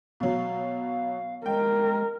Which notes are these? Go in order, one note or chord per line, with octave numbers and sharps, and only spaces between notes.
B2 F#3 F5
G#3 A#4 G5